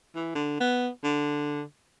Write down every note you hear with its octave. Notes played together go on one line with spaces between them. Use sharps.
E3
D3
B3
D3